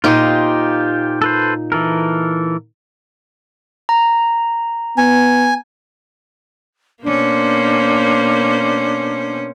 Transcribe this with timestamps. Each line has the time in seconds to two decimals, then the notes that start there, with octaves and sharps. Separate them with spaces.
0.04 A#2 D#4 F4 G4 C5
1.22 A4 B4 C5
1.72 E3 A4 A#4
3.89 A#5
4.98 B3 G#5
7.04 B2 A#3 C#4 D4 C5